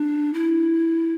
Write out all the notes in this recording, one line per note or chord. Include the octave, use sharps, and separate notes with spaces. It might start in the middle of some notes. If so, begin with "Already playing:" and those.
Already playing: D4
E4